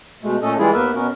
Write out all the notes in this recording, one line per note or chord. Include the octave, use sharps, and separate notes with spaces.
B2 G#3 A3
A#2 A3 C#4 A4 D#5
E3 G3 G#3 E4 F4 G#4
D#2 A#3 B3 A#4 B4 E5
B2 B3 C#4 F#4 A#4